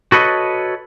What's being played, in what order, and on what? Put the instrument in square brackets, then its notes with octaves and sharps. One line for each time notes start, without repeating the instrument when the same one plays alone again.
[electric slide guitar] F#4 A4 B4 C#5 D#5